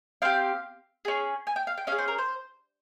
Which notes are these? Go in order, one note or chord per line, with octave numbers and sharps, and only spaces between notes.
C4 G4 F5
C#4 G#4
G#5
G5
F5
G5
C#4 G#4 F5
C5
A#4
C5